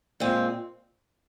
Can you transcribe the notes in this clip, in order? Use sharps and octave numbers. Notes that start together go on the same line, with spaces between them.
A#2 G#3 C4